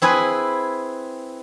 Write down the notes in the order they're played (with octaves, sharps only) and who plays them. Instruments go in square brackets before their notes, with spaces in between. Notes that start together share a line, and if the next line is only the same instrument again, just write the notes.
[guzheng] C4 E4 G#4 B4